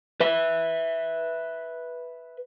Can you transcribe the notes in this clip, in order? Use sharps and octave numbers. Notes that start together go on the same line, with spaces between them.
B4 E5